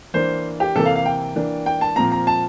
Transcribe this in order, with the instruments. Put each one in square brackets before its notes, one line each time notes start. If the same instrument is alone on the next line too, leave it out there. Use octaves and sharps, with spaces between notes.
[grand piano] E3 A#3 D4 C5
G4
C3 E3 A#3 A4
F5
F5
G5
E3 A#3 D4
G5
A5
A#2 F3 C4 A#5
A#5
A5